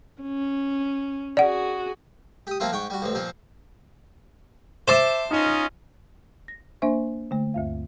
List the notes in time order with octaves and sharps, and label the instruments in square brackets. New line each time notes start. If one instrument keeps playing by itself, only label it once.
[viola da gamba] C#4
[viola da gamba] F#4 G#4 [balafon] D5 F#5
[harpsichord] G4 D#6
F3 A#3 C4 E4 F4
G#2 F#5 G5 C#6
G3 F#4
A1 G2 C4
A#2 F3 C4
[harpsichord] C5 A5 [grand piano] E5 D6 E7
[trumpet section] C#4 F4 D#5 [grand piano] D#4
[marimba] A#6
A#3 D4 C5 E5 C#6
D3 A3
D2 G2 F5